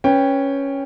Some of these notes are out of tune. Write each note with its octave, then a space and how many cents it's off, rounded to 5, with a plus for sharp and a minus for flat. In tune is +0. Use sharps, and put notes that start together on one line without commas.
C#4 +0 B4 +0 G5 +15